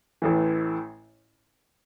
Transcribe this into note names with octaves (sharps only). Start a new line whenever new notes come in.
A1 A2 E3